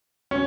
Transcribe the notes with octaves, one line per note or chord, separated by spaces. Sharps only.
C#4